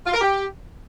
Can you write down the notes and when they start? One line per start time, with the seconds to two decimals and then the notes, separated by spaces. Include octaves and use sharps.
0.07 F4
0.14 A#4
0.21 G4